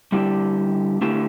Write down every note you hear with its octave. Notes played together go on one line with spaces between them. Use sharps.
D3 G3 E4 G4
D3 A3 E4 G4